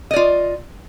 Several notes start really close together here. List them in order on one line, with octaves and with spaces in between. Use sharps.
D#5 D5 F4